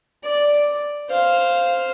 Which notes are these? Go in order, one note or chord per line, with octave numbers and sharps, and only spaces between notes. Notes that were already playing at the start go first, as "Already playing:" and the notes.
D5
C5 F5